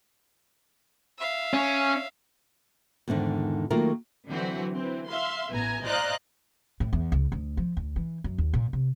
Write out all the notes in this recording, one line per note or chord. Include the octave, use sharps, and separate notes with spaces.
E5 F5
C#4
E2 G#2 D3 D#3
D#3 F#3 A3 A#3 F4 A#4
D3 E3 F#3 C4 F#4
E3 C4
E5 F5 C6
A1 E3 B3 G#5 A#5
C5 D5 D#5 F5 A#5 F#6
A2
E2
C#2
D2
F3
D2
E3
F#2
D#2
A#2
C3